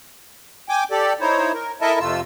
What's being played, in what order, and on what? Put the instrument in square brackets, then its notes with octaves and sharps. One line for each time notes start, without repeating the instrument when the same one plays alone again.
[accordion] G5 G#5 D6
G4 A4 D5
D#4 E4 C5 C#5
A#4
E4 A4 A#4 D#5 E5 A5
F2 C3 A3 F4 E6